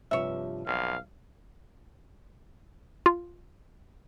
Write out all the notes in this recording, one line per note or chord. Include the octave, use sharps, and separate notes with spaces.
G2 C3 F3 C#5 E5
B1 F2 F5
F4